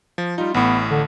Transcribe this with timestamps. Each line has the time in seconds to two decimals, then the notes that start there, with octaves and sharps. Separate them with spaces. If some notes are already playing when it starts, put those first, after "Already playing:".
0.18 F3
0.38 G3 D#4 F4
0.54 A1 A2 B3
0.90 D3